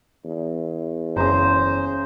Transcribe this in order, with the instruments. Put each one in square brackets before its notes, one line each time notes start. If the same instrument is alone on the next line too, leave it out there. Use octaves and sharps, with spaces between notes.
[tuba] E2
[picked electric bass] F#1 [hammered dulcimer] C#3 A#5 [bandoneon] C5